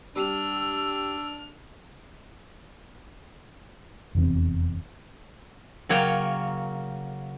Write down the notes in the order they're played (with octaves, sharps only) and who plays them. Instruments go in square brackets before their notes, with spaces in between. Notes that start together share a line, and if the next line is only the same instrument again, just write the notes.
[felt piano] G3 [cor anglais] D4 [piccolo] E6 [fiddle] F6
[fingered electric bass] F1 E2 C4
[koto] C#3 F#3 A#3 C#5 G5